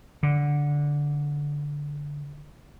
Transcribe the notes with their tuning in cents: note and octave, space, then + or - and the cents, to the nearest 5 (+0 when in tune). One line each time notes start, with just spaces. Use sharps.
D3 -10